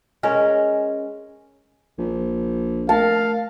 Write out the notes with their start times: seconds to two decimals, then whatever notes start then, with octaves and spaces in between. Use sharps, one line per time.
0.23 G#3 C#4 A#4
1.98 A#1
2.89 A3 A#4 F5 A5